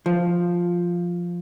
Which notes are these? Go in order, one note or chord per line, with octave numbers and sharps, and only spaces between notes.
F3